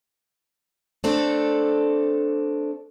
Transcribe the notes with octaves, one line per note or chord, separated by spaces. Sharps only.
A3 C4 D4 A4